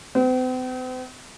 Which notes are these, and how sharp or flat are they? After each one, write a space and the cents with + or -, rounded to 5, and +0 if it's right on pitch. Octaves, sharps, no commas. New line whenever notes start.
C4 -45